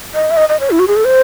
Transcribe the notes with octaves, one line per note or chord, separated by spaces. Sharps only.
D#5
E5
D#5
D#5
C#5
E4
F#4
G#4
A4
C5